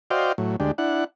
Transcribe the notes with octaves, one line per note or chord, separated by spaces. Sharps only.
F#4 C5 D5 D#5 F5 G5
A2 F#3
D2 G#3 D4 G4
D4 E4 F#5